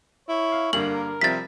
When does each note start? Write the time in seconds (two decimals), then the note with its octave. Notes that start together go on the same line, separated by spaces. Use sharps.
0.29 E4 C#5
0.52 F5
0.73 G2 D3 A#3 F#7
0.93 A#4
1.21 C3 F3 G3 C4 A6 B6